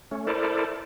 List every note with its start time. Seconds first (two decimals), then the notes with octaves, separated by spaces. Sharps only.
0.11 A3 C#4
0.27 E4 A4 A#4 C5 D5